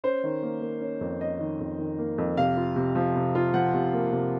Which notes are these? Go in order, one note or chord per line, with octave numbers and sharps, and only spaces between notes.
C#4 C5
D#3
A#3
A#3
C#4
F2
C#4 D#5
D#3
F2
D#3
A#3
F2
C3 F5
F4
C3
F3
C3
F4
F3 F#5
C3
A#3
C3